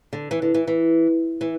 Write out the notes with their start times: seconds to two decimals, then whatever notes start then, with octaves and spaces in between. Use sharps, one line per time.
0.13 D3
0.31 E3
0.42 D3
0.54 E3
0.67 E3
1.41 E3